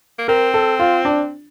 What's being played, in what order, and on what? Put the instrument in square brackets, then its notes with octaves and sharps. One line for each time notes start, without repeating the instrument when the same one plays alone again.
[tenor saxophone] A#3
[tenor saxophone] C4 [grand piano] A#4
[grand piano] A4
F4
D4